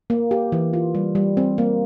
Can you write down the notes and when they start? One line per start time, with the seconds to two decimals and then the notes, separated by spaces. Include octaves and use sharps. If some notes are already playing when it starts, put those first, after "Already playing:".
0.10 A#3
0.31 G4
0.52 E3
0.73 F4
0.95 G3
1.15 G3
1.37 C4
1.58 A#3